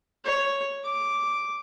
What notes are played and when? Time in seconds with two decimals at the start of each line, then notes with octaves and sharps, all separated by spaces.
0.25 C#5
0.84 D6